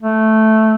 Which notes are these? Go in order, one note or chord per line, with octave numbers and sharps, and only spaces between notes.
A3